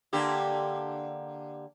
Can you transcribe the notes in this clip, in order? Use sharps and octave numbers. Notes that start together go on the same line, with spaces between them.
D3 A#3 G4